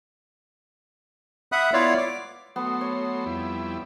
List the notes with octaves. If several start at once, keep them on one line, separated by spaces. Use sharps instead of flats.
E5 F#5 B5 D#6 F#6
B3 E4 F4 C#5 D5 F5
D6
F#3 A3 B3 C6
C#5
F2 G3 E4